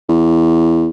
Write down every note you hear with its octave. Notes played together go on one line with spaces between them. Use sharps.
E2